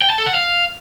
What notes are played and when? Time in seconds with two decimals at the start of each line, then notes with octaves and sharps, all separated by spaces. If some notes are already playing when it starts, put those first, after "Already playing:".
0.02 G5
0.10 A5
0.18 A4
0.26 F#5
0.34 F5